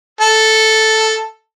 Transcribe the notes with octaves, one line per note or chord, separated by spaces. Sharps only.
A4